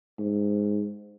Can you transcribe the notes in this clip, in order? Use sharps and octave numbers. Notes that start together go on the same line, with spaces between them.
G#2